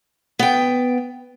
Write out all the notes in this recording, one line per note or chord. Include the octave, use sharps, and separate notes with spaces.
B3 G5